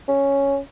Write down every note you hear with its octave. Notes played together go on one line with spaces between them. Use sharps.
C#4